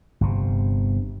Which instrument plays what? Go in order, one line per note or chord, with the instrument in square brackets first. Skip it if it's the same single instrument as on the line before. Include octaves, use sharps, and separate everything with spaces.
[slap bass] G1 C3